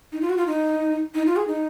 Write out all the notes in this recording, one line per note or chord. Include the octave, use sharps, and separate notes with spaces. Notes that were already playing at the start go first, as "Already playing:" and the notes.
D#4
F4
F#4
F4
D#4
D#4
F4
G#4
D#4